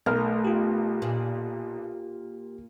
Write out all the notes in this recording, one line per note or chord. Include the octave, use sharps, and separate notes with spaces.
B1 A3 A#4 F6
F4 G4
A#2